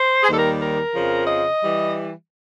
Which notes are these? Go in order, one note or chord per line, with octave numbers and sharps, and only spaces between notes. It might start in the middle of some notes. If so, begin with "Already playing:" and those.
Already playing: C5
G#4
D#2 D#3 G3 A4
A#4
A#4
F2 C#3 F3
D#5
E3 G3